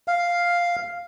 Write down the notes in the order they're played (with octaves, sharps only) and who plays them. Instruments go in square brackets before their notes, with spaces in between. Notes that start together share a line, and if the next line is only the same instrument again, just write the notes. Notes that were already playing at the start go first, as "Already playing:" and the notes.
[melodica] F5